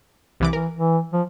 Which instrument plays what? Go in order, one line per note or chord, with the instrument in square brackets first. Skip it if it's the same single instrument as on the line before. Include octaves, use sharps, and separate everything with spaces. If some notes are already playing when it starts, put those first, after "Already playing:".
[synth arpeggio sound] C2 E3 D6
[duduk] E3 [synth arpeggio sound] A#4
[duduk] E3
F3